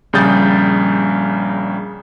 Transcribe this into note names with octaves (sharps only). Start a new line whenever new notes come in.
A#1 C#3 G3 D#6 G6 A6